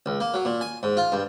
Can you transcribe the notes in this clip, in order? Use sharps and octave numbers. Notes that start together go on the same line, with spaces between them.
C#2
A#3
F#3
A#2
G#5
G#2
F4
G2